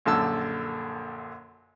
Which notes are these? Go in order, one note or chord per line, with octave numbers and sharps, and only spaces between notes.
A#1 F#2 D3 A5 E6